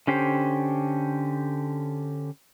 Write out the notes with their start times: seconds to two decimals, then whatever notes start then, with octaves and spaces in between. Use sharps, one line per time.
0.07 D3 C#4 G4 C5